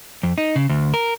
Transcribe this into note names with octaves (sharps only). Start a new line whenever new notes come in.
F2
D#4
C#3
D2
A#4